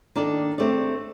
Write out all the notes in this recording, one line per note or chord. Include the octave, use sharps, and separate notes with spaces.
D#3 A#3 D4 A4 D5
A3 C4 G4 D5